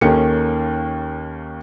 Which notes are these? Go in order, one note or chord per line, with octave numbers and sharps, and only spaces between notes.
D#2 D#3 A#3 C#4 A4 C#7